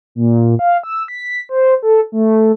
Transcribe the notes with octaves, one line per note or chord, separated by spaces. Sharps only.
A#2
F5
E6
B6
C5
A4
A3